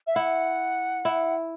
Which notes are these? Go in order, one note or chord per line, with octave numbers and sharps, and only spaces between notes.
E5
E4 F#5
E4